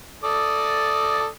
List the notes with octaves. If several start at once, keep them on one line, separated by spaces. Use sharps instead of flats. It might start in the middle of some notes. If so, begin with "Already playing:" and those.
A4 D5 D#6